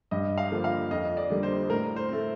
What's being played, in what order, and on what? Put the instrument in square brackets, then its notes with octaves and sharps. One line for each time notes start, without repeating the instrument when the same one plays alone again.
[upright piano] G2 D#5
F5
D3 F3 A#3
F5
F2 D#5
D5
D3 G3 A#3
C5
A2 A#4
C5
A3 C4